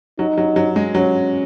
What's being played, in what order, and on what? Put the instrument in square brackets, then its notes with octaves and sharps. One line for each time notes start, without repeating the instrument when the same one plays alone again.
[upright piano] F#3 [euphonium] D#4
[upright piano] F#3
F#3
G#3
[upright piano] F#3 [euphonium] C#4